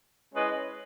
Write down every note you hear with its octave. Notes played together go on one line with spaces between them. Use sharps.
G#3 C#4 E4 B4 D#5